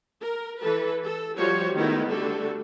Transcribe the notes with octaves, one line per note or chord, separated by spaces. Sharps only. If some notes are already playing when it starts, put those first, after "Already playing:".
A#4
E3 A4 B4
A4
F3 G3 F#4 C5 C#5
D#3 G#3 A3 B3 D#4 E4
D3 G3 A3 F#4 A4